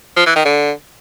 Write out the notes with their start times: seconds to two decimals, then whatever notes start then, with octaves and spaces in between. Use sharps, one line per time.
0.17 F3
0.26 E3
0.36 D#3
0.45 D3